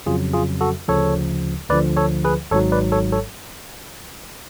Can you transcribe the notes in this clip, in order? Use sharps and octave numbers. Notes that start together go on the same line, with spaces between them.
F2 C#3 F#3 F4 G#4
F4 G#4
F#4 A4
D2 C#3 F3 A4 C#5
D2 D3 F3 B4 D5
A4 C#5
G#4 B4
G#1 G#2 F#3 A4 C#5
B4 D5
A4 C#5
A4 C#5